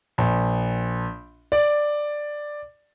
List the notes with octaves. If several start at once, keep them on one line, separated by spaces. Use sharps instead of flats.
A#1
D5